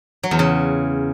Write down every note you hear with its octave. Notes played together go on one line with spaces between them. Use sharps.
F#3
E2
C#3